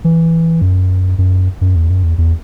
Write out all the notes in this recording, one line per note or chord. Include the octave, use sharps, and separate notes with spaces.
E3
F#2
F#2
F#2
E2
F#2
E2
E2